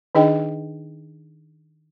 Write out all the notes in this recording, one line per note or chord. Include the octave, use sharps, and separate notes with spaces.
D#3 D4 D#4 G#4 D#5 G5